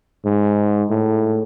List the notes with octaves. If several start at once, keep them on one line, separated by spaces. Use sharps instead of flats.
G#2
A2